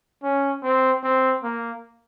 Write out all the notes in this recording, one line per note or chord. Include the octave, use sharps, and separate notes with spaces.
C#4
C4
C4
A#3